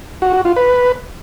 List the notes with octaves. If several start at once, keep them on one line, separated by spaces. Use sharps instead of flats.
F#4
F#4
F4
B4